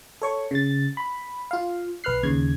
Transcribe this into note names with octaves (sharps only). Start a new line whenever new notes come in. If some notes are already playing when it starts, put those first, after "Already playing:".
A4 C#5 C#6
C#3 A6
B5
F4 F5
B1 B4 F6 F#6 C7
D#2 C#3 G#6